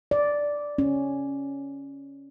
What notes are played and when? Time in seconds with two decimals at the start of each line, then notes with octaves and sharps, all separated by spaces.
0.11 D5
0.78 C#4